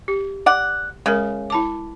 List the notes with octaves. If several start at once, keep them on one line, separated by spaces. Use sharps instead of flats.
G4
D5 F#5
C#3 G#3 A#4
E4 A5 D6